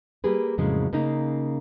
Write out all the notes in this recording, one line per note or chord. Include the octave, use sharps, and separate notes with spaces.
G3 A#3 G4 G#4 B4
F2 A2 C#3 F#3 G#3 A#3
C#3 A#3 C#4 D#4